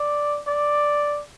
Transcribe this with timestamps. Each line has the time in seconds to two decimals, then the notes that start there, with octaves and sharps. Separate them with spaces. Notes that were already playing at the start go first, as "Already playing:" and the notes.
Already playing: D5
0.47 D5